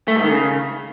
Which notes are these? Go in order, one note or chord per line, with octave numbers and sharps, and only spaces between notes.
A3
G#2
D#3
C#3